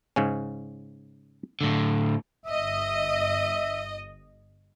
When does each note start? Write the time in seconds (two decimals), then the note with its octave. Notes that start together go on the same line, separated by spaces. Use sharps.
0.16 G#2 C#3 C#4
1.61 A2 D3
2.46 G1 D#5 E5